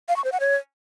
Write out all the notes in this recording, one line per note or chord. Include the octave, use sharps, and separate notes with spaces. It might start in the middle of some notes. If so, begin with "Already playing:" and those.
F5
C#6
C5
F#5
C#5